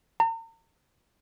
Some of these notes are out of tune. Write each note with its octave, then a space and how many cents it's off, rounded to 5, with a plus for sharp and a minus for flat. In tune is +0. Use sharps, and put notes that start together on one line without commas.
A#5 -45